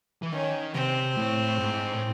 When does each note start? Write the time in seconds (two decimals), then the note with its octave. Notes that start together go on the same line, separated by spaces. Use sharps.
0.22 E3
0.32 D#3 C#4
0.74 C3 C4
1.17 A2
1.60 G#2
1.94 A2